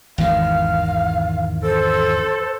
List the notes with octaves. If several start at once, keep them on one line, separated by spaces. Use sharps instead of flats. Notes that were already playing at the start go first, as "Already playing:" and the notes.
G#1 E2 D#3 F5
A4 C5